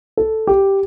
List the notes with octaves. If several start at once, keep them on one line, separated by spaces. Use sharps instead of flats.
A4
G4